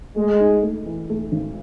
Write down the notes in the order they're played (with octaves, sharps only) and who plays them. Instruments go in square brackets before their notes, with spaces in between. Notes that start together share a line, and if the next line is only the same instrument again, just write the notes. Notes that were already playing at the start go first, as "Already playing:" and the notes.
[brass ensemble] G#3 [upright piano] A3
[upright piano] G#2
A3
E3
A3
G#1